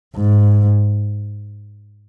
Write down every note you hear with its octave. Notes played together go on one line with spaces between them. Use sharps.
G#2